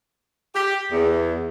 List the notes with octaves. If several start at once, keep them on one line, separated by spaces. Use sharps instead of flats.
G4
E2